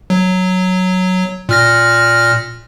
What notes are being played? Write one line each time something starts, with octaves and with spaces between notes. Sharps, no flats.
F#3
A#2 F6 A#6